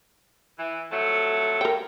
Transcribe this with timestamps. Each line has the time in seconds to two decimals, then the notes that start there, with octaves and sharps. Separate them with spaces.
0.59 E3
0.92 F2 F#3 A3
1.61 A#4 G5